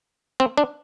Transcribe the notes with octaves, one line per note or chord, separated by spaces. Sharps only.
C4
D4